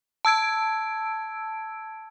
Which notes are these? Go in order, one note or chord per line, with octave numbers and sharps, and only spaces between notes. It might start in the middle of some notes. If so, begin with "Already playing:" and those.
A5 E6 G#6 D7